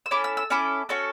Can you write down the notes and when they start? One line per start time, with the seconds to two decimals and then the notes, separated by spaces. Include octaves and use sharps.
0.06 E6
0.11 C#4 E4 A4 D6
0.24 E6
0.37 E6
0.50 C#4 E4 A4 D6
0.89 C#4 F#4 A4 C#6